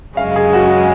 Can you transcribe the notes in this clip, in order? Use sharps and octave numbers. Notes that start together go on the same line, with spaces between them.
F#2 C#3 G#3 C#4 F5
G#4
F#4